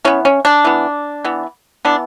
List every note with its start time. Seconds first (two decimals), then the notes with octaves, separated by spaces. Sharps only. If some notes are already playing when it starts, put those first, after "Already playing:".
0.05 E3 B3 C#4
0.25 C#4
0.45 D4
0.64 E3 B3
1.25 E3 B3
1.85 E3 B3 D4